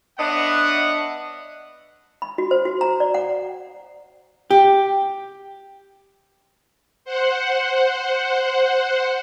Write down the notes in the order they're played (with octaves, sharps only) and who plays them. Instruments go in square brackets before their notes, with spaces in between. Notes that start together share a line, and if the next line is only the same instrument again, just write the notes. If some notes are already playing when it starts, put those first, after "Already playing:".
[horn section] B3 D4 C#5 D#5 E5 F#5
[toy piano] B5
F#4
C5
F#4
A#5
D5
F#5
[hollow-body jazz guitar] G4
[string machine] C5 F#5